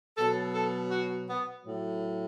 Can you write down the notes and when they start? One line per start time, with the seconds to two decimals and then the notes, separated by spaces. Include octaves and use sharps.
0.16 B2 F#3 A4
0.53 A4
0.90 F#4
1.27 B3
1.65 A2 F#3